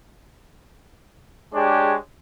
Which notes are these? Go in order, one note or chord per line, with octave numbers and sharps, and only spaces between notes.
G#3 D4 G4 G#4 C#5